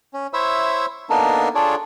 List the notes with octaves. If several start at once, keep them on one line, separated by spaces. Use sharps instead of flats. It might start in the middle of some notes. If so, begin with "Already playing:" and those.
C#4
E4 C5 C#5 E5 E6
A#3 B3 D4 D#4 A4 A#4
D4 F4 G#4 A4 C#5 D5